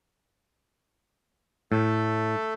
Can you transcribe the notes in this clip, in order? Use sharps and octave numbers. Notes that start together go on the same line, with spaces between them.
A2 A3 A4